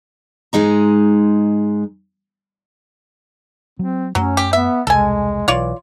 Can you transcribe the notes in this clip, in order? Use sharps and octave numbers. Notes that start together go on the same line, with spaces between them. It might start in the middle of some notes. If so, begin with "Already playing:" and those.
G#2 G#3 D#4 A#5
F#3 C4
F#2 F#3 A3 C#4
G4
B3 E5
E1 C2 G#3 A4 G#5
B1 E3 F4 C#5 D5